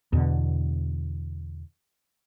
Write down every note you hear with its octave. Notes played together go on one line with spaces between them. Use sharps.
E2 B2 D3